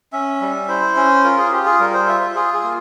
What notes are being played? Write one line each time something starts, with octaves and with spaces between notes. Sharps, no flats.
C#4 E5
G3
E4 C5
C#4
F4 A#4
G#4
F4 G4
G#4
G3 A#4
C5
F4 E5
E5
F4 G#4
G#4
A#3